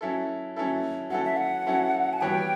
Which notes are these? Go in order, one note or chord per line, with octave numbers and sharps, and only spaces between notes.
F#3 C#4 E4 A4
F#3 C#4 E4 A4
F#3 C#4 E4 A4 F#5
E5
F#5
F#3 C#4 E4 A4
A5
E3 G3 B3 F#4 C#5 G5